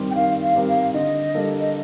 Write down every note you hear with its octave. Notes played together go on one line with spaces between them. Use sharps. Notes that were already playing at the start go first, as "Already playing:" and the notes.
Already playing: D#3 G3 C4 G4 A#4
G5
D#3 F5
F5
G3 C4 G4 A#4
F5
D3 D#5
G3 A#3 D4 A4
D#5